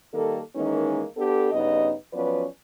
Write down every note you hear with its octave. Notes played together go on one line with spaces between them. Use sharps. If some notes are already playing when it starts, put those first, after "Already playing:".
D#3 G3 A#3 A4
D#3 E3 G#3 A#3 C#4 D#4
B3 D4 G4 A4
G2 C#3 B3 D#4 D#5
F3 F#3 B3 C#4 B4 D5